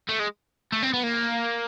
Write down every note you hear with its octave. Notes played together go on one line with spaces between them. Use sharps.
A3
G#3
A3
C4
B3
A#3